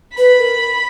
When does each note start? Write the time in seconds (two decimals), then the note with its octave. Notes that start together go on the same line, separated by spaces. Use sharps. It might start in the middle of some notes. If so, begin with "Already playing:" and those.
0.17 B4 B5
0.39 A#4